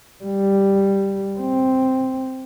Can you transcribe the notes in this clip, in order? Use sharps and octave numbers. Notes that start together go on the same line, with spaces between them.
G3
C4